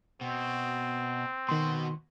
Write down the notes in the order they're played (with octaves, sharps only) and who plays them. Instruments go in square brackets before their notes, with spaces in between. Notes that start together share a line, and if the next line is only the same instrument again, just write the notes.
[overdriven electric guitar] B2 [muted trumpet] C4
[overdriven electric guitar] B2 F#4 [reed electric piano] D#3 C6